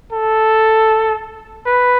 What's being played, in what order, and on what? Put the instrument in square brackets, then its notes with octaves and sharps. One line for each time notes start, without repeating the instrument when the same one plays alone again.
[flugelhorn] A4
B4